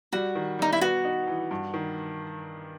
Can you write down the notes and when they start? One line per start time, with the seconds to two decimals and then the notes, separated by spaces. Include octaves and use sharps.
0.13 G3 F#4
0.35 D#3
0.59 G3 D#4
0.73 E4
0.81 B3 F#4
1.05 D#4
1.27 E3
1.51 G2
1.74 D#3